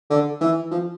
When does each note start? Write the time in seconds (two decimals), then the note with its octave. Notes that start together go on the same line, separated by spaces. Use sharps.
0.10 D3
0.41 E3
0.71 F3